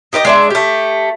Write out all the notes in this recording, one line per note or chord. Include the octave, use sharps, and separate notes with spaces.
D#4 G4 B4 D#5
G#3 D4 E5
A3 G4